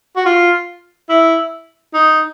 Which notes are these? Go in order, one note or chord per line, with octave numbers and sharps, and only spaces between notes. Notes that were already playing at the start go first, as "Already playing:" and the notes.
F#4
F4
E4
D#4